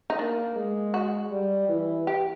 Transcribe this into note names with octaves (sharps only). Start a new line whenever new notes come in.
D#4
A#3 D4
G#3
F#4
G3
E3
G4